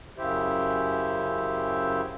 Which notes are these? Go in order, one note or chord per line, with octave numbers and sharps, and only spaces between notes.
F#2 C#3 E4 G4 C5 E5